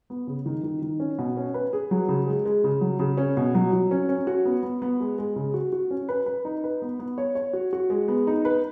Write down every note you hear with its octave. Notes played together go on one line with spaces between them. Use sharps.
B3
C#3
D#3
D#3
D#3
C#4
B2
C#4
B4
G#4
F#3
C#3
G#3
G#3
C#3
F#3
C#3
C#4
B2
F#3
F#3
C#4
C#4
F#4
B3
B3
B3
G#3
G#3
C#3
F#4
F#4
C#4
B4
B4
D#4
B4
B3
B3
C#5
C#5
F#4
F#4
G#3
B3
D#4
B4